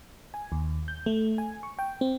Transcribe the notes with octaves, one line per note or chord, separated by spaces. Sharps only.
G#5
D#2
G6
A3
G#5
C#6
G5
C4